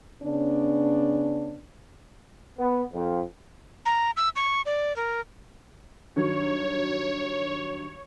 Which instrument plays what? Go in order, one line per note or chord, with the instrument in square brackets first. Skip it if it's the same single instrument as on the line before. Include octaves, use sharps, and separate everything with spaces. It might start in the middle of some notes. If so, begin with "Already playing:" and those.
[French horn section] C#3 B3 C#4 D4
[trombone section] B3
F2
[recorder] A#5
E6
C#6
D5
A#4
[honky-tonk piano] G2 D#3 F#3 [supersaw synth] C#5